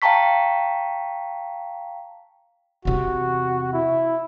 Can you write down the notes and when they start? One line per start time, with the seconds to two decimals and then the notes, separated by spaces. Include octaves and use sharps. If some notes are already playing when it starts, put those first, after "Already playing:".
0.02 F5 G5 A5 A#5 C#6 B6
2.85 E2 C3 F#4
3.73 E4